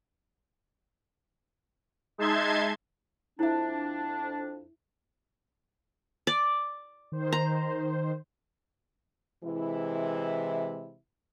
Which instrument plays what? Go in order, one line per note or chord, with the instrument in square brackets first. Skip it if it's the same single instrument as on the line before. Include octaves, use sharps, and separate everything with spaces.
[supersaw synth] G#3 D#4 E5 A5 C6 G#6
[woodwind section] F2 D4 [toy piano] E4 E5
[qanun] D5
[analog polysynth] D#3 C5
[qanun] A#5
[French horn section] C3 E3 G#3 E4